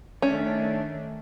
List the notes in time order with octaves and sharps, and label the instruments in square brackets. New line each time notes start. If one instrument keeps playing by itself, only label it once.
[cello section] D#3 A3 D4 [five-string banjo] C#4